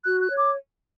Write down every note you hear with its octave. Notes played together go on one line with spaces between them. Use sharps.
F#4 F#6
F#6
C#5
D6